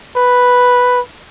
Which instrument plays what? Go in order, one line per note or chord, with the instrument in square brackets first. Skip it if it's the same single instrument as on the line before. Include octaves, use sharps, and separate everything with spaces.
[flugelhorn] B4